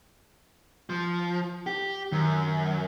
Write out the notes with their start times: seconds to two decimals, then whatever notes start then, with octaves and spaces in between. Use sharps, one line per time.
0.90 F3
1.67 G4
2.12 F#2 D#3